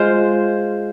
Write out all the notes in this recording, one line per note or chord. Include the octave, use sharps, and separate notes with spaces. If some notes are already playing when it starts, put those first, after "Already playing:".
Already playing: G#3 F4 C5